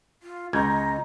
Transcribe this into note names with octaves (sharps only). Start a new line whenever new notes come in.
F4
C#2 D#5 A#5 G6 G#6